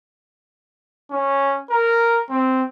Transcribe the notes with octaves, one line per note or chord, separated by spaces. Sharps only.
C#4
A#4
C4